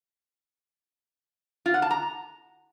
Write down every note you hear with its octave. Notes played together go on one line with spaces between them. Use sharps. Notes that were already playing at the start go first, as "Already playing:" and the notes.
F4
F#5
A5
A#5